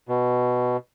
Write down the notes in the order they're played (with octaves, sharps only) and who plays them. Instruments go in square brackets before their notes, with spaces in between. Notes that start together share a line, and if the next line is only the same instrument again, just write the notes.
[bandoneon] B2